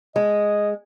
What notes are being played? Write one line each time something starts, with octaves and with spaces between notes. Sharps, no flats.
G#3 D#5